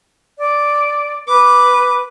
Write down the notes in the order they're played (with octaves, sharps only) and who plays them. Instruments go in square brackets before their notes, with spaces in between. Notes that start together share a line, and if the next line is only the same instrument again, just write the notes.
[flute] D5
[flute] B4 [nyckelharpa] D6